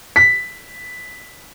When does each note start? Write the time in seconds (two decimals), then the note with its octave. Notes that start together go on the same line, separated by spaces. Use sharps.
0.16 B6